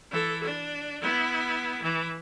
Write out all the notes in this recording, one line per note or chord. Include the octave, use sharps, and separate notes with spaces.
E3 A4
D4
B3 E4
E3